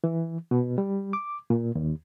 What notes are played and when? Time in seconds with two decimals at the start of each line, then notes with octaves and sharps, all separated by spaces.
0.04 E3
0.51 B2
0.78 G3
1.13 D6
1.50 A#2
1.75 D#2